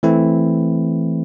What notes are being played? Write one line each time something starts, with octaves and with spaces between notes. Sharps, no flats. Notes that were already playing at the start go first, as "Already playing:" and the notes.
E3 A3 C4 E4